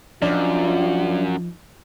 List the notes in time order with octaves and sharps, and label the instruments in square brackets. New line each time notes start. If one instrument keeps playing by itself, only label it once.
[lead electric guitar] F#2 [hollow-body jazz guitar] F3 D#4 [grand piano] D4 [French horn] F4